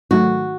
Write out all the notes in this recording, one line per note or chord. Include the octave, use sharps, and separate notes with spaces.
G#2 D#3 F#3 A3 F#4